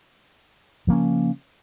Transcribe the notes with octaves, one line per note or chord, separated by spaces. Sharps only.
C#3 F3 A#3 C#4